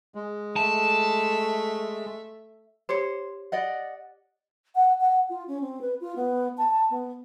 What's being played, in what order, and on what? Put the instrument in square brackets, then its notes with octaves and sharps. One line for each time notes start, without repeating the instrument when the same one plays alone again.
[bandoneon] G#3
[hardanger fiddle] A3 E5 [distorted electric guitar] A5
[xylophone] G4 C#5 C#7 [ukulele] C5
[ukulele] D5 D#5 F#5
[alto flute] F#5
F#5
F4
C#4
C4
B4
F4
B3
A5
A5
B3